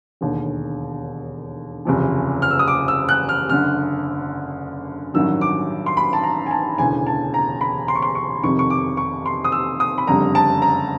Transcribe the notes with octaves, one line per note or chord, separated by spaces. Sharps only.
E1 D#2 D3
F#1 E2 C3 F3
F6
E6
D#6
D6
E6
F#6
F6
F#1 F#2 D3 F6
A1 G2 D#3 F#3 E6
D6
C6
B5
A5
A#5
G#5
A5
E1 D2 C#3 E3 G#5
A5
A#5
B5
C6
C#6
C6
C#6
F1 F2 C3 D#3 C#6
C#6
D6
C#6
C6
D#6
E6
D#6
B5
F#1 F2 D3 G3 A#5
A5
A#5